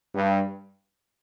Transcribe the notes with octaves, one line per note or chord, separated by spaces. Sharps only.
G2